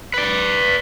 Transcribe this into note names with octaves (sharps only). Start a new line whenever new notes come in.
B4 D5